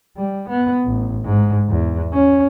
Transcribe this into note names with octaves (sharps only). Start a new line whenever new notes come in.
G3
B3
A1
G#2
E2
C#4